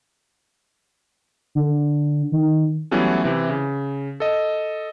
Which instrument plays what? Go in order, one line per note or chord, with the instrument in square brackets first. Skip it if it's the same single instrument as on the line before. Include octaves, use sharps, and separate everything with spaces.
[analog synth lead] D3
D#3
[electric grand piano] E3 F#3 G3 A3 B3 C#4
C3 E3
C#3
A4 D#5